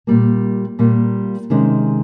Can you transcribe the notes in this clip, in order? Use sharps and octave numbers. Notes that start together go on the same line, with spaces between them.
A#2 G3 A#3
A#2 G3 A#3
C3 D#3 G#3 C#4